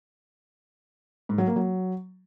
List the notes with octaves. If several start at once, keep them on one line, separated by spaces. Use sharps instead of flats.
G#2
F#3
A#3
F#3